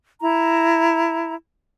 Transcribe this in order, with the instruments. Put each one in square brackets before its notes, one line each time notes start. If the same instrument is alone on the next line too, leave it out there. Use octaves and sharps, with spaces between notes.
[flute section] E4 A#5